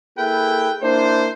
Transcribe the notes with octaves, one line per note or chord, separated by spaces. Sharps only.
A#3 E4 G#4 A4 B4 G5
A#3 D4 E4 C5